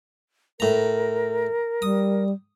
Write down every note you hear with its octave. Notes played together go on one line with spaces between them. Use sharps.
A2 A#4 A#5
G3 D#6